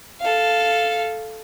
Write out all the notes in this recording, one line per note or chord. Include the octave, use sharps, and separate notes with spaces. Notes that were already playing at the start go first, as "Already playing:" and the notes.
A4 F5